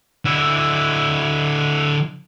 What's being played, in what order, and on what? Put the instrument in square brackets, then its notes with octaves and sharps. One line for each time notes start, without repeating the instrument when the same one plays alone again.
[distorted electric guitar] D3 E4